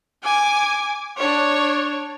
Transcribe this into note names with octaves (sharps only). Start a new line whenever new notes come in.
G#5 D6
D4 C#5